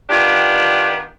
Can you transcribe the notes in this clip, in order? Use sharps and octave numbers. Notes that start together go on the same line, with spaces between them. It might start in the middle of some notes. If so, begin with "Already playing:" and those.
D#3 B3 D4 F4 G4